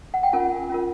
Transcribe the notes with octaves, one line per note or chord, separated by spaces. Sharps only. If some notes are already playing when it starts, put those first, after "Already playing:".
F#5
G5
C#4 F4 A#4 F#5 G#5
C#4 F4 A#4